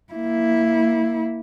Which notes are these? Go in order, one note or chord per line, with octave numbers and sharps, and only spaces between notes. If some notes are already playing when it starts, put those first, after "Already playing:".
A#3 E4